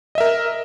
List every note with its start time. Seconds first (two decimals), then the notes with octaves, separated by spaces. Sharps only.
0.15 D#5
0.18 E5
0.20 A#4